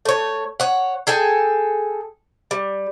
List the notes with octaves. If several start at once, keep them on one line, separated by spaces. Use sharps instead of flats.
A3 C#5
C#5 F#5
G#4 A4 G5 G#5
G3